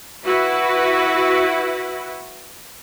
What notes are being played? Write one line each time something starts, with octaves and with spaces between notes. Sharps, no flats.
E4 F#4 B4